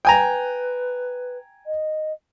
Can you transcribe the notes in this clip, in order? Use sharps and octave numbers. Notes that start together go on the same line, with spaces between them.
B4 G5 G#5 A#5
D#5